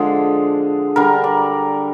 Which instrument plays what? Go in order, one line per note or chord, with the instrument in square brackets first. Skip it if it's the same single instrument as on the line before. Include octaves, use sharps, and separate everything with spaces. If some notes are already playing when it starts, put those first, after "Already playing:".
Already playing: [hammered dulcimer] D3 F3 G#3 D4 G#4
D3 G3 D4 A#4
D5